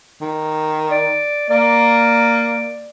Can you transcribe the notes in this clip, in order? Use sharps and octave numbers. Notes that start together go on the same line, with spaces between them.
D#3
D5
A#3 D5